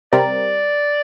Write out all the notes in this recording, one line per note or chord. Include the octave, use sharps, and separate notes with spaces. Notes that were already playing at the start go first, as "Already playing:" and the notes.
C3 G3 C4 G4 A#4 D5